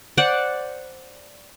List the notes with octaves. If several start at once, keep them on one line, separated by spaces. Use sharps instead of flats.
C5 D5 F#5